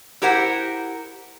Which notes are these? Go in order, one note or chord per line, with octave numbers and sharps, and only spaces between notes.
E4 G4 A#4 C5 F#5